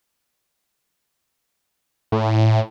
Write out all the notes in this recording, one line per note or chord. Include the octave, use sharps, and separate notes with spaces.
A2